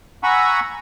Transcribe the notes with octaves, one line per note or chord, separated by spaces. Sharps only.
F#5 G#5 A#5 B5 C#6 E6